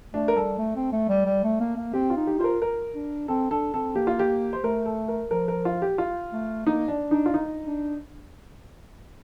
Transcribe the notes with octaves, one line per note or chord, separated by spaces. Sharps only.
A3 D4
A#4
G3 A4
A3
C4
A3
G3
G3
A3
A#3
A#3
C4 G4
F4
D#4
G4
F4 C5
A#4
A#4
D4
C4 A4
D4 A4
C4 A4
A#3 G4
F4
G4
C5
A3 A#4
A4
A#4
F3 A#4
A#4
F4
G4
F4
A3
A#3 D#4
D4
D4 D#4
F4
D#4
D4